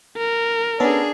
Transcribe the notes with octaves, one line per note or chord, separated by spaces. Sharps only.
A#4
B3 C#4 D4 G#4 A4